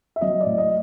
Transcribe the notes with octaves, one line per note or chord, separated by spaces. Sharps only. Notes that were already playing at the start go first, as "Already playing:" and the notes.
E5
F#3 D#5
D5
A2
D#5